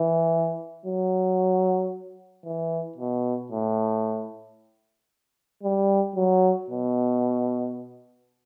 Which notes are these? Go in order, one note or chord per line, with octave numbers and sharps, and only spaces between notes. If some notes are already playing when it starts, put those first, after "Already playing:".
Already playing: E3
F#3
E3
B2
A2
G3
F#3
B2